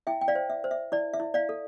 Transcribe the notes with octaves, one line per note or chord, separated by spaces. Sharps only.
E4 E5 G5
G5
D5 F5
C5
E5
C5
E5
E4 D5
E5
E4
D5 F5
A4